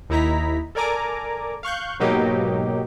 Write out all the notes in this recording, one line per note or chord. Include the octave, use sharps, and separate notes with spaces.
D#2 D#4 E4 A#5 B6
A4 A#4 D5 G#5 A#5 D6
F5 C#6 F#6 G6
G#2 B2 F#3 A#3 D#4 G4